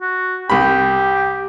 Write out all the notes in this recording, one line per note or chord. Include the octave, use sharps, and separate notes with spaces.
F#4
C2 G4 G5 B5